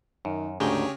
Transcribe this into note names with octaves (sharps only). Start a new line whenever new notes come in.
F#2 D#3
D2 G#2 C#3 G4 G#4 C#5 G5